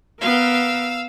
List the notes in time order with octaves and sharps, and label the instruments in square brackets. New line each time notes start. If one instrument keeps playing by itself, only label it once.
[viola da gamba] B3 A#4 [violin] F5 E6